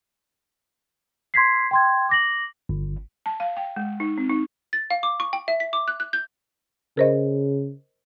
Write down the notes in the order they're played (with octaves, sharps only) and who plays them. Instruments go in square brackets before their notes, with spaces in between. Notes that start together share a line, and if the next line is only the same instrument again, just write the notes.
[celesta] C6 G#6 B6 C7
G5 C6 G#6
D6 A#6 F#7
[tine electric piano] G1
[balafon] A5
F5
G5
G#3
D#4
C4
D#4
[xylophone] A6
F5
D6
C#6
G5
E5
B6
D6
F#6
F#6
G6
[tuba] C#3 [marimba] A#4 C5 D#5